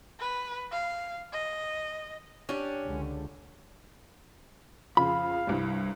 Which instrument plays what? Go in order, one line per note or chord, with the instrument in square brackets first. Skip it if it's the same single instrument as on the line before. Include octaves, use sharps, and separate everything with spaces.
[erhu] B4
F5
D#5
[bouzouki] C#4 [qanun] D4 G4
[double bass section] C#2 D3
[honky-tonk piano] F2 C#3 [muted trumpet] F5 [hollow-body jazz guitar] B5
[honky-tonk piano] C2 G2 G3